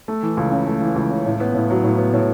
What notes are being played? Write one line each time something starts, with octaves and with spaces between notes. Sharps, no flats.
A3
E3
C#2
C#3
A3
E3
C#2
C#3
A2
B3
A2
F#3
A2
B3
A2